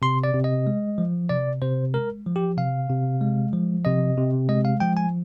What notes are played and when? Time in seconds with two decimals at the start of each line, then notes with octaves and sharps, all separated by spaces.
0.02 C3 C6
0.24 D5
0.34 C3
0.44 D#5
0.67 G#3
0.98 F3
1.29 C3 D5
1.62 C3 C5
1.94 G#3 A#4
2.26 F3
2.36 G4
2.58 C3 F5
2.89 C3
3.21 G#3
3.53 F3
3.85 C3 D#5
4.18 C3
4.49 G#3 D#5
4.65 F5
4.80 F3 G5
4.97 G#5